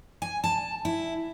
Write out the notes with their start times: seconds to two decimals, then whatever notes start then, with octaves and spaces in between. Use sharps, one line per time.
0.22 G#5
0.44 A5
0.85 E4